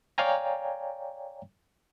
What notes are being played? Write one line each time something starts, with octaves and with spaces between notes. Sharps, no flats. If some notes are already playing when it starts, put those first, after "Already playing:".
C#5 D5 F5 G5 G#5 A#5